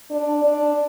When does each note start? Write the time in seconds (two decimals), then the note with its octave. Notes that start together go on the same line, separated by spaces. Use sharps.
0.10 D4
0.44 D4